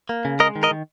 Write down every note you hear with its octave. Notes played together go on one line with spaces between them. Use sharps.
A#3
C#3
G#3 A#4 D#5
D#3
A#4 D#5
D#3